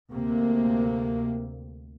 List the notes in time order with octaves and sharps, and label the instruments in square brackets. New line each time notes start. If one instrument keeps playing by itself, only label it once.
[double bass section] D2 C3 A#3